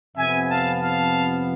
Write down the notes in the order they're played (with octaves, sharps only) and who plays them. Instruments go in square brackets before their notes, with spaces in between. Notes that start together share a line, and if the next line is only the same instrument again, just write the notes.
[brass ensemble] F2 C3 F3 B3 E5 G#5
F5 A5
F5 A5